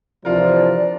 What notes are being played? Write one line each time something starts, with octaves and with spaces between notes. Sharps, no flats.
C3 E3 F3 D4 F4 A#4 D5